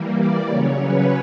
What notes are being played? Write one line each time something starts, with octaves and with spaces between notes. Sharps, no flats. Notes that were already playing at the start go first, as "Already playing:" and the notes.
Already playing: E3 G3 A#3
D5
C#3 F#3 C#4 C#5
B4